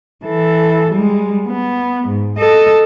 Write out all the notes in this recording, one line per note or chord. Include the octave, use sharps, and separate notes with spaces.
E3 A4
G3 G#3
B3
G#2
A4 D#5